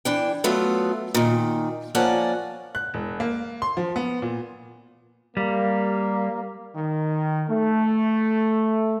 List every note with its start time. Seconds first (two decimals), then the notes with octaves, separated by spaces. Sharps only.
0.05 E3 D4 G5
0.44 F#3 A3 B3 F4
1.14 A#2 D#3
1.95 F3 A#3 C#4 D5 F#5 A5
2.75 F#6
2.94 E1
3.20 A#3
3.62 C6
3.77 F3
3.96 B3
4.22 A#2
5.37 G3 A#3
6.75 D#3
7.49 A3